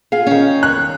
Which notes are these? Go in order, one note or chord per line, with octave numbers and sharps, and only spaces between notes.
F4 G#4 F5
D#3 C#4
F#6